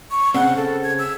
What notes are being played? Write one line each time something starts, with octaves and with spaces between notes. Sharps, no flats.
C#6
C#3 C4 F#5
A4
G#6
E6